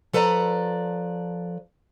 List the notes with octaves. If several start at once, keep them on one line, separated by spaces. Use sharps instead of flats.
F3 A4 B4 D5 A#5